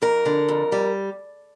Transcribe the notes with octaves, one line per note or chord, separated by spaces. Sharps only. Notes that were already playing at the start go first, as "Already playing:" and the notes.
F2 A#4
D3
F2
G3